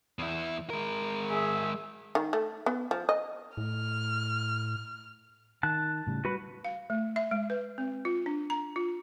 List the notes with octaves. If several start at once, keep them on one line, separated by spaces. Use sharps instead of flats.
E2 E4
G#3 A#4
G#4 E5
D#3
A3
B3
F3
D#5
A2 F6
D#3 A5 F#6
A2 C#3 G3
G3 F#4 B4 B5
F5
A3
E5
G#3
B4
C4
F4
D4
A#5
F4